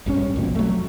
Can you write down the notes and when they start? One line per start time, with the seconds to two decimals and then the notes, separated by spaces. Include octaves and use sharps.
0.06 G#1 G2 A#2 C#4
0.36 C2 F2 B2 A#3
0.55 F#3 A3